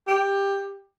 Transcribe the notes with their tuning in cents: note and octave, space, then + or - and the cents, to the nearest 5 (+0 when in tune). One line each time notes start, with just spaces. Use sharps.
G4 +15